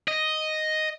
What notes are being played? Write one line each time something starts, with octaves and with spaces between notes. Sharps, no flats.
D#5